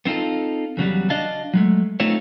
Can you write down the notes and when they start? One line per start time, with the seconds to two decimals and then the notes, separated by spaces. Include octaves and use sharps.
0.06 B3 C4 D#4 F4 A4
0.77 E2 C#3 F#3 G3
1.10 D4 F#4 D5 D#5 F5 A5
1.53 F#3 G#3 A3
2.00 A3 C4 D#4 F4 C#5